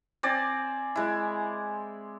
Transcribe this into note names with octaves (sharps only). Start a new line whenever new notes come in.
C4 D5 G#5
G#3 E4